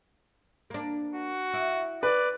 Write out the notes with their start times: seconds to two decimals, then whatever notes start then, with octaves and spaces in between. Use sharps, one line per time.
0.70 A#3 D4
1.15 F#4
1.54 E4
2.03 B4 D5